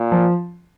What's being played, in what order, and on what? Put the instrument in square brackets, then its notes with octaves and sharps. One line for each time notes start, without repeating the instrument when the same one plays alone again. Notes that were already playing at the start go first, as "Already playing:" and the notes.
Already playing: [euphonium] A#2
[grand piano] F3